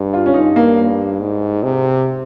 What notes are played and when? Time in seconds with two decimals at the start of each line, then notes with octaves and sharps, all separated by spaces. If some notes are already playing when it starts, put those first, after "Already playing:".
Already playing: G2
0.13 F4
0.26 C#4
0.34 G2 D#4
0.56 A#3
1.20 G#2
1.63 C3